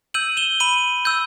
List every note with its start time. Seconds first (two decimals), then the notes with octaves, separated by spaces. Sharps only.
0.14 E6 G6 D#7 F#7
0.37 E7 G7
0.60 B5 D#7 F#7
1.05 E6 G6